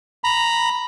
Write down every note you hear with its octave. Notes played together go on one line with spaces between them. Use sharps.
A#5 B5